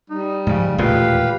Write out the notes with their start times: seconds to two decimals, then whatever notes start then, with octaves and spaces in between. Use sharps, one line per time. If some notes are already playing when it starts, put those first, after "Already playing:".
0.10 G3 D#4
0.47 G#2 C#3 F3
0.78 E1 D#2 A#2 A3 G4 B4 F5